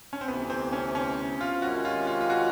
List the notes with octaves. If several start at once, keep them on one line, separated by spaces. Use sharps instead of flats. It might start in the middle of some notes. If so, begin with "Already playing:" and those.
C#4
C4
D2 C3 E3 B3
C4
C#4
C#4
F4
C3 D#3 G#3 C#4 F#4
F4
F4
F4
F#4